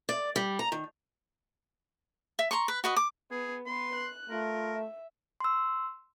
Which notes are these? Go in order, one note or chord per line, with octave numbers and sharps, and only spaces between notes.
D5
G3
A#5
D#3
E5
A#5 C6 C#6
B4
F#4 B4 D#5
D6
B3 G#4
B3 B4 C6
F#6
A3 F4 A#4
E5
C6 E6